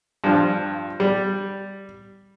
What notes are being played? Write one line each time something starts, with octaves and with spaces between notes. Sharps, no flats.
G2 F3
G3